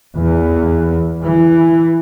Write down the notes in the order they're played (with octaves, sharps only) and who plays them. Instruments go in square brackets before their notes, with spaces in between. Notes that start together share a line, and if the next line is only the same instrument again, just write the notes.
[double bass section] E2
E3